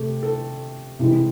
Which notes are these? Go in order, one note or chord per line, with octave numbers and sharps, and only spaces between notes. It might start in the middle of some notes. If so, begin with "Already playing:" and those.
Already playing: C3 A3
A4
C3 E3 G#3